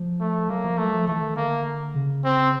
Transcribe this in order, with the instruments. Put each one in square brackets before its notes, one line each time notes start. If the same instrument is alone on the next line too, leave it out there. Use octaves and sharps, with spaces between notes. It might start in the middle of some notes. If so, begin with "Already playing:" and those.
Already playing: [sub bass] F3
[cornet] A3
[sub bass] F#3 [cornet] A#3
[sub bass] F3
[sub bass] F#3 [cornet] A3
[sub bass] F3
[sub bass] E3 [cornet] A3
[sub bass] D#3
[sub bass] D3 [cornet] A#3
[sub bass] C#3
[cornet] C4